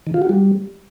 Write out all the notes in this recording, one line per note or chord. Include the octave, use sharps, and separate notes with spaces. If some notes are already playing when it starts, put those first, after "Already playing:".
D#3
F4
F#4
G3